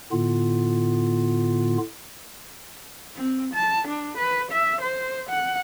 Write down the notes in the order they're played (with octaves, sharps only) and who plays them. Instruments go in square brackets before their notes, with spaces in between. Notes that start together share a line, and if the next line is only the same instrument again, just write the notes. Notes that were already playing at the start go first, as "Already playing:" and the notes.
[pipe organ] A2 D3 B3 F4
[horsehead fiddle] C4
A5
D4
B4
E5
C5
F#5